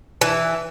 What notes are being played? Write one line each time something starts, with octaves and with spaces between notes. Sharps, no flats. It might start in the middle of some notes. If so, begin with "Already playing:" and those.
E3